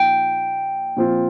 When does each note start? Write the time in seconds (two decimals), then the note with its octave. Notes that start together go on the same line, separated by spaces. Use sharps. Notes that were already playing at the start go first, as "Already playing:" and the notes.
Already playing: A#2 F3 D#4 G5
0.97 A#2 F3 C4 F4